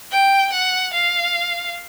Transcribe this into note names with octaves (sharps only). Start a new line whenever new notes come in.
G5
F#5
F5